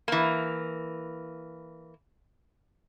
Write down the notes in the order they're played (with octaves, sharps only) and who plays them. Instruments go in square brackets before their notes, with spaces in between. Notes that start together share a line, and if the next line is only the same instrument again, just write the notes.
[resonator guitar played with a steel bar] E3 A#3